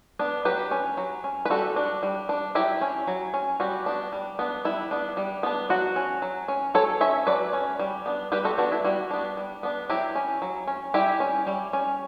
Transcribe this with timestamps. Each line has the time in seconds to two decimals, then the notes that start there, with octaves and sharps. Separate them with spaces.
0.19 B3 D4
0.45 F#3 G4 B4
0.71 C#4
0.97 F#3
1.24 C#4
1.45 B4
1.50 G3 F#4 A4
1.76 D4
2.03 G3
2.29 D4
2.55 F#3 E4 G4
2.81 C#4
3.07 F#3
3.34 C#4
3.60 G3 F#4
3.86 B3 D4
4.13 G3
4.39 B3 D4
4.65 G3 E4
4.91 B3 D4
5.17 G3
5.43 B3 D4
5.70 F#3 F#4
5.96 C#4
6.22 F#3
6.48 C#4
6.74 F#3 A4 C#5
7.01 C#4 C#5 E5
7.27 F#3 B4 D5
7.53 C#4
7.79 G3
8.06 B3 D4
8.32 G3 G4 B4
8.45 F#4 A4
8.58 B3 D4 F#4
8.72 E4
8.84 G3 F#4
9.11 B3 D4
9.37 G3
9.63 B3 D4
9.90 F#3 E4 G4
10.15 C#4
10.42 F#3
10.67 C#4
10.94 G3 E4 G4
11.20 C#4
11.47 G3
11.73 C#4